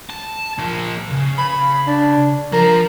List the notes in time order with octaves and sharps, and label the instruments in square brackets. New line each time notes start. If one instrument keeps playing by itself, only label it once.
[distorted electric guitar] A5
F3 A#3
C#3
[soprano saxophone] B5
D4
[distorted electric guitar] F3 [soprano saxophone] A#4